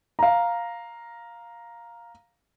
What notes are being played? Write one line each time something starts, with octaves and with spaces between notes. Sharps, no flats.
F5 A#5